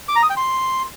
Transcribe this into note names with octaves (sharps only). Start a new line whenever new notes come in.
D6
A#5
D#6
G5
C6